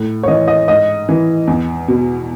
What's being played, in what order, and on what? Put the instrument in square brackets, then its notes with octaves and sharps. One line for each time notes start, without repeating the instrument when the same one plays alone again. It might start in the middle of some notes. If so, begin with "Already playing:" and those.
Already playing: [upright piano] A2
C#5
E3 D#5
D#5
G#2 D#5
E3
E2
B2